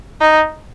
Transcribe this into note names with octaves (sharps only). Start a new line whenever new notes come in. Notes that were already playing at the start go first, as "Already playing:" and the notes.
D#4